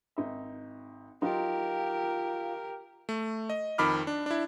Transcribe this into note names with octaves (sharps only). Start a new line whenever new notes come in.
G#1 D#4 E5
F#3 D#4 F4 G4 A#4
A3
D#5
F2 D#3 B5 D6 F6
D4
D4 E4